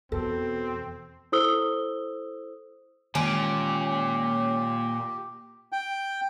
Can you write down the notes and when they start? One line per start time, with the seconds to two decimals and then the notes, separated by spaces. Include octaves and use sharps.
0.12 E2 B2 C4 A4
1.32 E4 A4 C5 D#6 E6 G7
3.15 A#2 D#3 E3 G#3 C#4 G4
5.72 G5